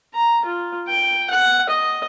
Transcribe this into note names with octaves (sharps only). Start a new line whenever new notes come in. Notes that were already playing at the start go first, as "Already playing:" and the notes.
A#5
F4
G5
F#5
D#5